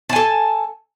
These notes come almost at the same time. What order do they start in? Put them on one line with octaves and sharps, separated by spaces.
A5 G#5 A4